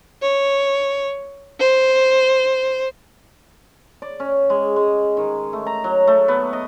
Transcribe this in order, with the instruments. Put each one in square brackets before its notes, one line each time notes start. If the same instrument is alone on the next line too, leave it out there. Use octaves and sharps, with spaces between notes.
[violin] C#5
C5
[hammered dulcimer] D5
C#4
G#3
G#3
D#3
A3
A#5
F#3
A3
B3
D#5